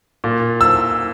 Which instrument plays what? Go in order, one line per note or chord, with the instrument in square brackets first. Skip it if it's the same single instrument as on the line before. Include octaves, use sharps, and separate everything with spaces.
[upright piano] A#2
E6